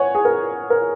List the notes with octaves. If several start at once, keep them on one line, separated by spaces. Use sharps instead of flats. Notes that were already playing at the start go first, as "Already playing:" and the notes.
Already playing: C#5 F#5 G#5
G#4
A#4
A#4